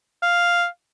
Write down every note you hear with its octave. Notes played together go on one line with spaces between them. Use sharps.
F5